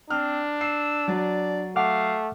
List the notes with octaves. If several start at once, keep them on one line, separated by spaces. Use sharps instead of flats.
C4 D4 F6
E6 C7
F#3 D5
A3 F5 F#5 D6 F6